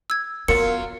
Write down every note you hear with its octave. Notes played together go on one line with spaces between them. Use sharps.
E6 G#6
F#3 B3 F4 A#4 C#7